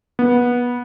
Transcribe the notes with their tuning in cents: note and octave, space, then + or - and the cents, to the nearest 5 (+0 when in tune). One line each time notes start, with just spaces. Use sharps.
B3 -20